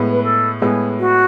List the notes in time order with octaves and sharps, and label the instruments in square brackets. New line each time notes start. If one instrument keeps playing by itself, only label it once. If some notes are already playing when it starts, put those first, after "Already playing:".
Already playing: [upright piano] A2 G#3 B3
[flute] B4
A4
[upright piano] A2 G#3 B3 [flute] G#4
[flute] F#4